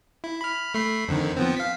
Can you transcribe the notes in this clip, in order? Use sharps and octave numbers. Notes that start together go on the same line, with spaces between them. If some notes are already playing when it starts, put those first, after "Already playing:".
E4
B5 F6
A3 B5 C7
F2 D3 D#3
F3 B3 C4
F5 B6